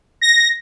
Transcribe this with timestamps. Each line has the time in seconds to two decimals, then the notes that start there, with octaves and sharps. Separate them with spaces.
0.21 A#6